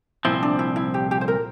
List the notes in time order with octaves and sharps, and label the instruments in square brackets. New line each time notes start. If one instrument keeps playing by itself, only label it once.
[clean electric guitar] C2 A#2 F3 C4 [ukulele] E4
[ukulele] D4
E4
E4
G4
G4
C5
A#4